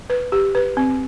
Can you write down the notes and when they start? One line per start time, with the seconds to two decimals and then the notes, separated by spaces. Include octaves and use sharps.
0.10 B4
0.32 G4
0.55 B4
0.77 C4